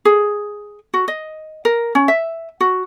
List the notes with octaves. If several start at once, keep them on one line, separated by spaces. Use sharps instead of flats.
G#4
F#4
D#5
A#4
C#4
E5
F#4